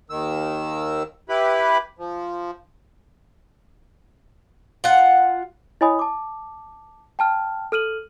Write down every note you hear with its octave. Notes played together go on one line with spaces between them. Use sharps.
D#2 D#3 E6
E4 G4 B4 B5
F3
F4 F#5
E4 C#5 D#5 G#5 B5 D#6
A5 D6
G5 A5 F6
A4 F6 D#7 F#7